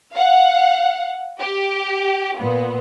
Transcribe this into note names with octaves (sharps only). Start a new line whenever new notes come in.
F5 F#5
G4
A#2 B3